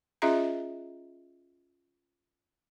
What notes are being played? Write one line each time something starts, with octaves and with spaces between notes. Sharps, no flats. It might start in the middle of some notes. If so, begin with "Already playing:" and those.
C#4 F4 G#4 D#5 E5 A#5